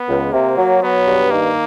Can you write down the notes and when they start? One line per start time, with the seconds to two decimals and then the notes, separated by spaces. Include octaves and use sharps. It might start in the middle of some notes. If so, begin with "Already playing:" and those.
Already playing: B3
0.09 C#2
0.32 C3 A#3
0.58 F#3
0.82 F#3 B3
1.06 G2
1.31 D#3 A#3